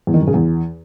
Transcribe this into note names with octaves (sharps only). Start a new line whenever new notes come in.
E2
D#3
F#2
C#3
E2